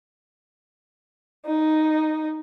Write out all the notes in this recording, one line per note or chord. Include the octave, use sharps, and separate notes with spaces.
D#4